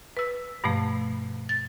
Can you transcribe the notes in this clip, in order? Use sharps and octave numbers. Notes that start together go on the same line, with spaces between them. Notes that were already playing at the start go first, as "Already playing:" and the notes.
B4 E6
G2 B2 F3 A3
A6